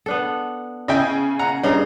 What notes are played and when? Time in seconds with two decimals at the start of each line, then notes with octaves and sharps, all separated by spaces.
0.06 B3 D4 A4
0.88 C#3 D#5 E5 G5 G#5
1.39 F#5 A#5
1.63 G2 C#3 D#5 A#5